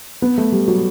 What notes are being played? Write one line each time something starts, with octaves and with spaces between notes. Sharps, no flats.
B3
A3
G3
F#3